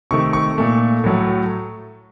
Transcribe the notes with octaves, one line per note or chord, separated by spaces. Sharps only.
C3 D#3 A3 C#6
C#6
A#2 A3
A2 F#3 A3